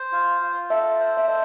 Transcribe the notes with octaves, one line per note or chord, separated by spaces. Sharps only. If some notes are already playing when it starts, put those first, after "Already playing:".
Already playing: C5
F4
F4
A4 E5
C5
E5
A4 D#5